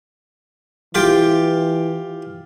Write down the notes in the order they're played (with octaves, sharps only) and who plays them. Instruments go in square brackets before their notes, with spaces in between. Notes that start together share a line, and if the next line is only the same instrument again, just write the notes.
[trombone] E3 [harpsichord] F4 G4 G5